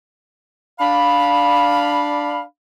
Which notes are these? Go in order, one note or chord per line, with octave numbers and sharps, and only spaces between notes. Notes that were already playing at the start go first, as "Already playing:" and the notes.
D4 F5 B5